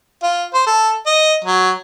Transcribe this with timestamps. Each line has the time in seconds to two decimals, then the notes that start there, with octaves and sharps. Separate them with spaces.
0.23 F4
0.54 C5
0.67 A4
1.06 D#5
1.44 F#3